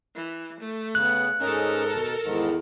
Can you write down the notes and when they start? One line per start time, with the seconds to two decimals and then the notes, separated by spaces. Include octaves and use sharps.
0.15 E3
0.60 A3
0.95 C#3 B3 F#6
1.40 G#2 C#4 D#4 A4 A#4
1.92 B2 A5
2.24 E2 G#2 D#3